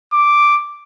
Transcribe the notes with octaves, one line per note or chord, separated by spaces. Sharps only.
D6